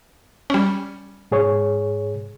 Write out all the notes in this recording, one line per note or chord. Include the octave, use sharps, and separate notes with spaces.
G3 C#4
G#2 G#4 C#5